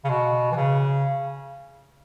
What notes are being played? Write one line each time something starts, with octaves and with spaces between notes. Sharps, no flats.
C#3
B2
E3
C#3